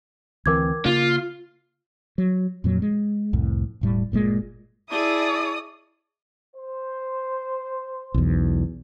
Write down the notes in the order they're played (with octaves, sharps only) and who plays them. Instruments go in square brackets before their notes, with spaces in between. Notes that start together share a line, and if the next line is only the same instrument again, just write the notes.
[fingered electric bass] D2 E3 C4 [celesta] A#4 D6 G#6
[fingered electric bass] C#3 A#3 [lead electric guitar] F4
[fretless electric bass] F#3
F2 A#2 F#3
G#3
C2 F2 A2
E1 A2 G3
G1 A#2 D3 G#3
[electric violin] E4 [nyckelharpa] G#4 A5 [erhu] D5 [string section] D#6
[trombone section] C5
[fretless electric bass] B1 E2